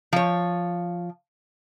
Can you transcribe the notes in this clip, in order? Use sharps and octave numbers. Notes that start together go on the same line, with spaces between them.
F3 C#5